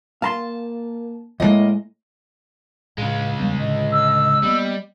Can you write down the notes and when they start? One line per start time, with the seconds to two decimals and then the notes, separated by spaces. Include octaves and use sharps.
0.22 A#3 F5 A5 A#5 C6
1.40 D#2 A2 G#3 A#3 D#5
2.98 A2 C#3 G#3 F5
3.40 E2 G3 B3
3.60 A2 D3 D#5
3.92 E6
4.43 G3 A#3 B3 D#5